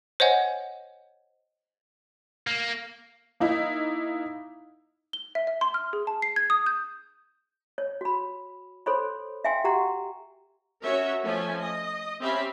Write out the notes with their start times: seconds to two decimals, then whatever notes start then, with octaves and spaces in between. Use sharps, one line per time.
0.20 C5 C#5 D#5 F#5 G#5
2.47 A#3
3.40 A#3 D#4 E4
5.13 G7
5.35 E5
5.47 E5
5.61 C6
5.74 F6
5.93 G#4
6.07 A5
6.22 C7
6.36 G#6
6.50 D#6
6.66 G6
7.78 C#5
8.01 F#4 B5
8.86 A4 C5 C#5 B5 C6
9.44 E5 F5 G5 G#5 C6
9.64 F#4 G4 F#5 A#5 C6
10.82 C#4 F#4 A#4 C#5 E5
11.23 F3 A3 C#4 E5 G#5
11.60 D#5
12.21 C4 C#4 G4 E5 F5 B5